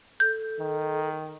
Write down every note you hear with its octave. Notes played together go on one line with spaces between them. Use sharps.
A4 G6
D#3